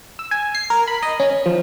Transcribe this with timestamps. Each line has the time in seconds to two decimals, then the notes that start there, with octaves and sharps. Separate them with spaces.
0.19 E6
0.31 G#5
0.55 C7
0.70 A#4
0.88 B5
1.03 D#5
1.20 C#4
1.46 F3